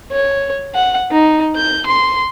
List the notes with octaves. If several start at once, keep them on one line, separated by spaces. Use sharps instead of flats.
C#5
F#5
D#4
G6
C6